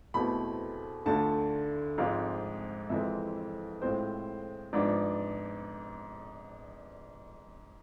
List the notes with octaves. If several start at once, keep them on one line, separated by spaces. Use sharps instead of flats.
E2 B2 A3 C4 E4 B5
D2 D3 A3 D4 F4 A5
G#1 G#2 F3 G#3 C4 F5
F2 E3 G#3 C4 E5
A2 G#3 C4 F4 C5
G#1 G#2 F3 B3 D4 D5